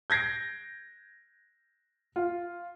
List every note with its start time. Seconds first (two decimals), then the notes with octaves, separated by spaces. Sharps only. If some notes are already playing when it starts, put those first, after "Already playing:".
0.10 G6 G#6 A#6 C7 D7
2.16 F4